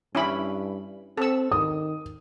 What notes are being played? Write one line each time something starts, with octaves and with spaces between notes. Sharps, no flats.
G2 C#4 E4 B5
C4 A4 E6
D#3 D#6